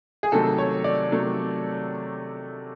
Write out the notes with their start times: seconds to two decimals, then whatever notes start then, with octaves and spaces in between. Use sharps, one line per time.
0.23 G#4
0.32 C3 D#3 F#3 A3 A4
0.58 C#5
0.84 D5
1.11 C3 D#3 F#3 A3